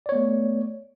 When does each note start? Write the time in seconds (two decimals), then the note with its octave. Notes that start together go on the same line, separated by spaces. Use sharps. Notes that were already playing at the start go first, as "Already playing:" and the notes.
0.06 D5
0.09 C#5
0.12 B3
0.15 A3